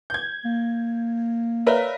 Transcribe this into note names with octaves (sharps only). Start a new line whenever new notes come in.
G6 G#6
A#3
A#4 B4 C#5 D5 E5 F5